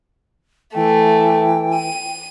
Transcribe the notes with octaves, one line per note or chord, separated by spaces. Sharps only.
E3 A3 G5
D#7